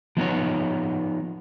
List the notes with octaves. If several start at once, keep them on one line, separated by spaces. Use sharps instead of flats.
F3 B3 D#4 C#5